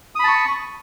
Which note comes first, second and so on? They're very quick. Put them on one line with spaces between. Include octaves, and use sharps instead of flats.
D#6 B5 A5 C#6